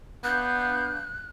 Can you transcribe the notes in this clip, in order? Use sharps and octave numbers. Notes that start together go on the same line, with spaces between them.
B3 D4 F5 F#6 G6